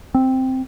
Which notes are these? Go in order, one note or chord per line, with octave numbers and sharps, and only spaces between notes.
C4